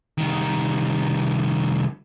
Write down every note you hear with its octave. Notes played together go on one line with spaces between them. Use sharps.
C2 D#3